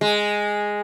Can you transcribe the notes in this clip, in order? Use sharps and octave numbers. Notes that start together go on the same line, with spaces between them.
G#3